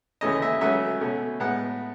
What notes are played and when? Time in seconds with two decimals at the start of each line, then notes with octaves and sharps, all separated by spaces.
0.21 D#2 C#3 E3 A3 C#4 D#5
0.42 E5
0.61 C#2 C#3 F#3 A3 C#4 E5
1.01 B2 A3 C#4
1.40 A2 G#3 B3 F#5